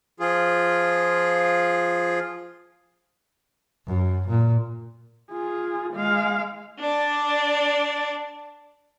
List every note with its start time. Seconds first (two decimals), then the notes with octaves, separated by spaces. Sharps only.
0.20 F3 F4 G#4
3.87 F#2
4.28 A#2
5.32 F4 G#4
5.94 G#3 F5
6.78 D4 D5